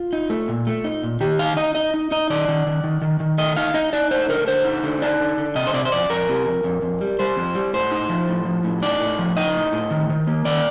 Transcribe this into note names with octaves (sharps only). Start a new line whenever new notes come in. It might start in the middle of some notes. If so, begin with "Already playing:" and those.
Already playing: F4
D#4
A3
A#2
A3
D#4
A#2
D#3 G4
D#4 F5
D#4 D#5
D#4 D#5
D#4
D#4 D#5
D#3 D5
D#3
D#3
D#3
D#3
D#3
A3 D#5
D#4 F5
D#4 D#5
D#4 D5
A3 C5
D3 A#4
D3 C5
D#4
D3
D#4 D5
D3
D3
C3 D#5
C5
C3 D5
C5
F2 D5
F2 A#4
C3
F2
F2
F2
G3
G3 C5
F2
G3
A2 C5
D#4
F3
A2
F3
A2
D#4 D5
A2
F3
D#4 D#5
A2
A2
D#3
D#3
A#3
D#3 D5